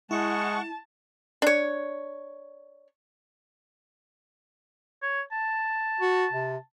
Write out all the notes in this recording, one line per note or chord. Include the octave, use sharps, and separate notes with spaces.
G#3 E4 F#5 A5 C#6
D4 C#5
C#5
A5
F#4
C3